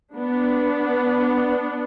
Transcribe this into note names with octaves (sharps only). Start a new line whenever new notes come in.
B3 D4